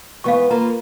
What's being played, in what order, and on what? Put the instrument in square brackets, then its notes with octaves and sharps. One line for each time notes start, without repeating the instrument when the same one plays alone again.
[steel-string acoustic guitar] G#2 E3 B3 [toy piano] F5 C#6
[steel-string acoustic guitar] A#3 F4 B4 [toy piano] A#5